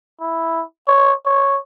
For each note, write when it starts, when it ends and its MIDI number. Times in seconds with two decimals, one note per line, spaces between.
0.21 0.63 64
0.88 1.14 73
1.26 1.58 73